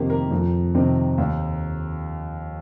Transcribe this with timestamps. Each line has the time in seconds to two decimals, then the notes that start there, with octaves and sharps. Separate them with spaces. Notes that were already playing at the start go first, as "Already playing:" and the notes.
Already playing: F2 C3 D#3 A#3 G4 C5
0.10 A#4
0.31 F2
0.75 C3 D#3 C4
1.18 D#2